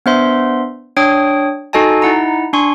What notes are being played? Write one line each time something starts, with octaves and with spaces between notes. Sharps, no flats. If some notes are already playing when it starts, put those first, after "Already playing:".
B3 D4 C5 E5 C6
D4 C#5 G5 D#6
D#4 F#4 A4 D#5 G#5 A5
D#4 E4 F#5 A#5
D4 G#5 C6 C#6